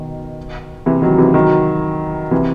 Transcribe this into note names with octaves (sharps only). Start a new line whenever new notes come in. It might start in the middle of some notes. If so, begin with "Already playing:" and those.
Already playing: B2 D#3
C3 E3
D#3 F#3
C3 E3
D#3 F#3
C3 E3